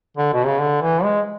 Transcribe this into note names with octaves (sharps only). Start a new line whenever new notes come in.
D3
B2
C#3
D3
E3
G#3